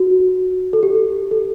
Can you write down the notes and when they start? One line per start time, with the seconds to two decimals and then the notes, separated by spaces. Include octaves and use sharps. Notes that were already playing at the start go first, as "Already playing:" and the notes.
Already playing: F#4
0.73 A4
0.83 G4
1.31 A4